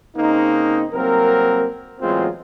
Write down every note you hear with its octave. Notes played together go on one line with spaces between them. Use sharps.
C#3 A#3 C4 D#4
C2 F#3 A#3 C4 A#4
A1 E2 F#3 G#3 C4 F4